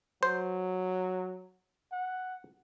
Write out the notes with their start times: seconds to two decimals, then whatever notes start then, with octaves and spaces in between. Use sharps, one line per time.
0.23 F#3 C5
1.92 F#5